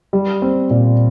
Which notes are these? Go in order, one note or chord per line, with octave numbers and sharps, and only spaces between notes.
G3
C4
A#2